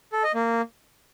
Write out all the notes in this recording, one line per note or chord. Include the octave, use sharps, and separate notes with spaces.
A4
D#5
A#3